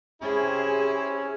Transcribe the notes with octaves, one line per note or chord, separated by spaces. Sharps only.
C3 C#4 E4 G#4